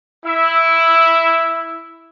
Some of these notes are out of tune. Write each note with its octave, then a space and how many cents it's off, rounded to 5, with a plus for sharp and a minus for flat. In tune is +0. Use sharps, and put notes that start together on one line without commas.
E4 +0 E5 +0